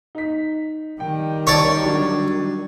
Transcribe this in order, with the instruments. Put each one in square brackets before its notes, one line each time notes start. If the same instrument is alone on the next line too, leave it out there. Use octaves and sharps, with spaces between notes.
[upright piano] D#4 B6
[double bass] D#3 G3 [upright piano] G5
[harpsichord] C#5 D5 [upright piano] A5 C#6
[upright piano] F#3 D4